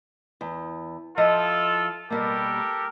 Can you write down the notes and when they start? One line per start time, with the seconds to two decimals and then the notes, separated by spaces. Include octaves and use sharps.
0.41 E2
1.17 F3 E4 F4 A4 D#5
2.10 B2 G3 A#3 G4 A4 A#4